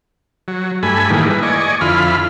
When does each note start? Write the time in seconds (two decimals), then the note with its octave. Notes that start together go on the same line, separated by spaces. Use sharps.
0.48 F#3
0.83 G2 A3 G#5 B5
1.10 A2 D#3 E3 G3 G#3 A#3
1.30 E4 B4
1.43 D5 D#5 G#5 C#6
1.81 F2 D3 E4 F4 B5 F6